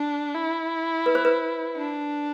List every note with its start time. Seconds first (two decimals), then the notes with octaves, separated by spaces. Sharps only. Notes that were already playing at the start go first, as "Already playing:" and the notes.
Already playing: D4
0.35 E4
1.06 B4
1.15 C5
1.25 B4
1.77 D4